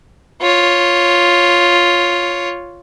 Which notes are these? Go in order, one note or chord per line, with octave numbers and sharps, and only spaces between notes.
F4 C#5